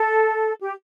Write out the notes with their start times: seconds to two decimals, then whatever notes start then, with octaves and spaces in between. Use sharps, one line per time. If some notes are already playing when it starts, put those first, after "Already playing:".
Already playing: A4
0.61 G4